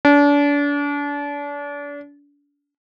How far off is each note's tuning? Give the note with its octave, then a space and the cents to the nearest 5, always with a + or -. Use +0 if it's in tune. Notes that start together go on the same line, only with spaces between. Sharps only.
D4 -35